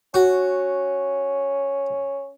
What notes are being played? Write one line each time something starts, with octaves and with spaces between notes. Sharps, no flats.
C#4 F#4